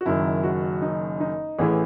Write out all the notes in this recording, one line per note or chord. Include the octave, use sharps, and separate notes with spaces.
F#4
F#1 F#2 D#3 E4
F#4
D#4
D#4
A1 A2 E3 G#4